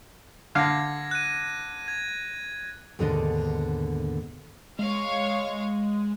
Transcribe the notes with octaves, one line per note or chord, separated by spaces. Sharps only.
D3 F5 G#6 A#6
F#6 D#7
G#6
D#2 G#2 B2 D3 D4 D#5
G#3 C#5 F5